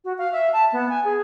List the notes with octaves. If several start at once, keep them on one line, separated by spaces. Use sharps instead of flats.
F#4
F5
E5
A5
B3
G#5
G#4